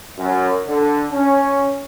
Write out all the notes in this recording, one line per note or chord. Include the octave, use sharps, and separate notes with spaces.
F#2
D3
C#4